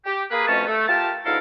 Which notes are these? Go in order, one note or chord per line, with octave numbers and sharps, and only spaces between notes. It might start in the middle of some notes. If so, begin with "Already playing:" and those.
G4
A#3 G#4 B4
F2 B2 A3 C#4 A5
A3
F4 G4 A#4 A5
D2 G#2 E4 A4 A#4 F5